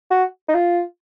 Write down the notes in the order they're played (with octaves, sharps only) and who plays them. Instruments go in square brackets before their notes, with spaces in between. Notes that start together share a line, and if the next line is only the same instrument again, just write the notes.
[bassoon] F#4
D#4
F4